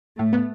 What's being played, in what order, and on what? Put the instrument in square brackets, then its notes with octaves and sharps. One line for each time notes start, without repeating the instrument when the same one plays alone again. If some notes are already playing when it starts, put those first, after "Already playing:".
[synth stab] A2 [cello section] A3
[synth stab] B3